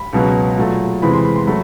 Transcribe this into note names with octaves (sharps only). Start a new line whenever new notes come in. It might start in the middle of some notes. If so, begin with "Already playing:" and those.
Already playing: B5
C#2 B2 F#3 B3
A#2 F#3 A3
E2 C3 E3 G#3 B5
C6
B5
C6
F#3 A3 B5